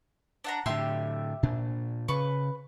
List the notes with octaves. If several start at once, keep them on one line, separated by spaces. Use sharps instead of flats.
D4 F#5 A#5
A2 D3 G4 E5 C6
A#2 D4
C#3 B4 C#6